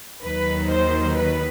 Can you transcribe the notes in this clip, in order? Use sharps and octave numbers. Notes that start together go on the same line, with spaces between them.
D#2 D#3 F#3 B4
C5
B4